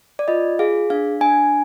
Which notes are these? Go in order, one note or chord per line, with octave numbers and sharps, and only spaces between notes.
D5
F4 D#5
G#4 F5
D4 F5
D4 G#5